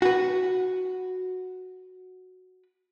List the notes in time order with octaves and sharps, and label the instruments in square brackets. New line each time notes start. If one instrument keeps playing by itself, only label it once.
[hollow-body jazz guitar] F#4 B4